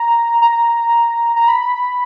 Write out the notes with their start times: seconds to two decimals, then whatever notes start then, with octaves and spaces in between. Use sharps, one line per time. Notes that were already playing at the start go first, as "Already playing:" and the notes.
Already playing: A#5
0.42 A#5
1.36 A#5
1.48 B5